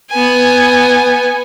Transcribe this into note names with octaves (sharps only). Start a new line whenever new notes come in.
B3 G#5